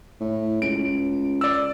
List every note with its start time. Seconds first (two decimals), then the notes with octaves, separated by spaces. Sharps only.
0.21 A2
0.62 C#2 D7
1.41 D5 E6